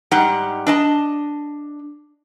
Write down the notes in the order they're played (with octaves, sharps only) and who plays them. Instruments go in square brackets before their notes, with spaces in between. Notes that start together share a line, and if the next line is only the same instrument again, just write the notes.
[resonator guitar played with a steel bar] G#2 G3 D#4 G4 F#5
D4 D#5 A5